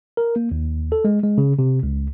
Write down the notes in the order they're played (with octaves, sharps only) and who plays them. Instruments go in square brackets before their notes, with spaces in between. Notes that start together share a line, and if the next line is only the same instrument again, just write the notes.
[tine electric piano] A#4
A#3
D#2
A4
G#3
G#3
C#3
C3
C#2